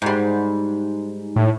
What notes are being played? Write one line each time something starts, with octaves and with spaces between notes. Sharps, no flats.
G#2 G3
A2